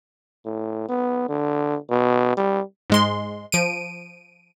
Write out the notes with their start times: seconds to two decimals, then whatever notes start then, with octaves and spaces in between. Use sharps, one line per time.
0.45 A2
0.89 B3
1.29 D3
1.90 B2
2.37 G3
2.90 G#2 G#3 C6
3.52 F3 D7 D#7